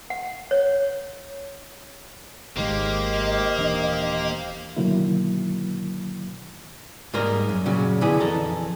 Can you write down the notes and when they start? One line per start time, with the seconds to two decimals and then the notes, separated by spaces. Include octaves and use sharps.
0.10 F#5
0.51 C#5
2.57 G#1 D#3 G#3 A#3 G4 C5 D#5
3.56 D#1 E3 D4
4.77 B2 D3 D#3 F#3 A#3 E4
7.14 G#2 G3 A#3 D#4 A#4 A#5
7.49 F#2
7.66 A#2 C#3 F#3
8.01 D3 B3 E4 G#4
8.20 F2 E3 A4 A#5